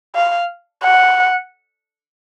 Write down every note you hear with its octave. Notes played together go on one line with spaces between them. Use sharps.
F5
F#5